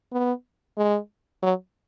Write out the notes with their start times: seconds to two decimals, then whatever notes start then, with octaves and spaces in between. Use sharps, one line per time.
0.13 B3
0.78 G#3
1.42 F#3